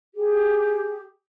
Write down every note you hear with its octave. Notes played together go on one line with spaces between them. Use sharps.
G4 G#4